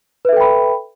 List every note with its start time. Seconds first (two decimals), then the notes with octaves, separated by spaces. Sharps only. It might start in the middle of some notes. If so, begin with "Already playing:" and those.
0.25 B4
0.29 E5
0.33 A4
0.37 G5
0.41 B5